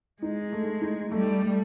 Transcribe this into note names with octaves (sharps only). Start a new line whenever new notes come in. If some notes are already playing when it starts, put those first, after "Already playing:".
G#3 D#4
A3
D#4
G3 A3
A3